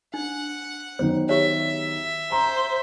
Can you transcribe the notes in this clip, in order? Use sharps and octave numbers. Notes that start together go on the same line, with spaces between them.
D4 F#5
D#3 F#3 B3 C5
G4 C#5 E5
C5 A#5 C6